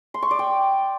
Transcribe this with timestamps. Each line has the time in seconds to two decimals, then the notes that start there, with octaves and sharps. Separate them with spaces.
0.14 C6
0.22 C#6
0.31 D5
0.39 G5